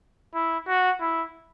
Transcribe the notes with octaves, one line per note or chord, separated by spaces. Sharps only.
E4
F#4
E4